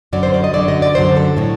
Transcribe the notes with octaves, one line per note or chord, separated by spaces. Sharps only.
F#2 D3 F#3 D5
C5
D5
D#5
F#2 D3 F#3 D5
D#5
D5
F#2 D3 F#3 C5
A4
A2 F#3